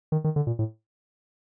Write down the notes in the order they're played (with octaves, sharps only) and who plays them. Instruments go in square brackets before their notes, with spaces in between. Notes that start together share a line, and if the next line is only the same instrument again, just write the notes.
[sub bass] D#3
D#3
D3
A#2
A2